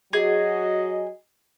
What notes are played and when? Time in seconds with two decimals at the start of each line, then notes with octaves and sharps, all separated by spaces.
0.13 F#3 F#4 G#4 D#5